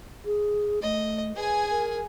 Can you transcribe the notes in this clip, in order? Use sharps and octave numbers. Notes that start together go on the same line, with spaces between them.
G#4
A3 D#5
G#4 B4 G#5
A#4